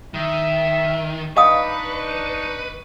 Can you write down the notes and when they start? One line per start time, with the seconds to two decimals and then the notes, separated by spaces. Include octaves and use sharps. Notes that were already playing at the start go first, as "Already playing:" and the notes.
0.14 D#3 E5
1.37 D4 D#4 B4 D#5 F5 C#6 D#6